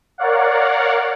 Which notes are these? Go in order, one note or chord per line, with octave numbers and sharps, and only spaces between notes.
A#4 C#5 D5 F5 F#5